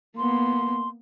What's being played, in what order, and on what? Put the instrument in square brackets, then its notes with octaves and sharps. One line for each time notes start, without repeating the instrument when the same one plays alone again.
[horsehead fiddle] A#3 B3 [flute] C6